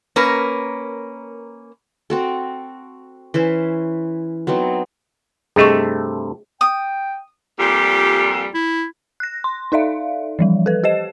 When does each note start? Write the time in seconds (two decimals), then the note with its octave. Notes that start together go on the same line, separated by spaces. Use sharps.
0.16 A#3 C#4 A#4 B4
2.10 C4 F#4 A4
3.34 E3 C#4 C5 E5
4.47 F#3 B3 C4 D#4
5.56 G2 C3 A3 G#4 D#5 C#6
6.61 G5 D#6
7.60 F2 A#2 G3 G4
8.54 E4
9.20 F#6 A#6
9.44 C6
9.72 D#4 A4 D5 E5 F5
10.39 E3 F3 G3
10.66 A4 B4
10.84 G4 C5 D#5 E7